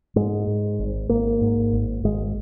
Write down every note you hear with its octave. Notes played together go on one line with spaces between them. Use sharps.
G#2 G#3
G#2
G#1
G#1 A#3
G#2
G#1
G#1 G#3